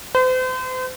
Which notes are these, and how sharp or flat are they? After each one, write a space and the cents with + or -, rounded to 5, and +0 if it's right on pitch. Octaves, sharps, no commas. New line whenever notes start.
C5 -40